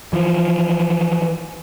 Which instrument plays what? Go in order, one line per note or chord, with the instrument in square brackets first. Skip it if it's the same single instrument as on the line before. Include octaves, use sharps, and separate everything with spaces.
[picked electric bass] E3 F3